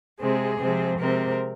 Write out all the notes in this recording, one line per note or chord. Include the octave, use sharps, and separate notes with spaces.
C3 G#3 C4 G#4
C3 F3 G#3 C4
C3 G#3 C4 A#4